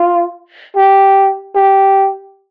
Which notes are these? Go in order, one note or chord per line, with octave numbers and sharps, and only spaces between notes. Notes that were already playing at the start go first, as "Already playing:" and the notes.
Already playing: F4
G4
G4